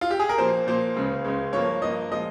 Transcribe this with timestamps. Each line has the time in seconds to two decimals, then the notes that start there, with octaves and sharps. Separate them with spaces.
0.01 F4
0.11 G4
0.19 G#4
0.29 A#4
0.38 A#2 F3 A#3 C5
0.67 A#2 F3 A#3 C5
0.96 C#2 C#3 G#3
1.24 C#2 C#3 G#3
1.53 G2 F3 A#3 C#5
1.82 G2 F3 A#3 D#5
2.11 A#2 F3 G#3 D#5